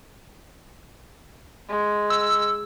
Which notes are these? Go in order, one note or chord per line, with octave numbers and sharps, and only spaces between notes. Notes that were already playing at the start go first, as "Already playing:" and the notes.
G#3
E6